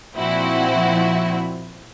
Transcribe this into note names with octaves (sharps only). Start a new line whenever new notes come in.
A#2 F3 C4 E4 F#4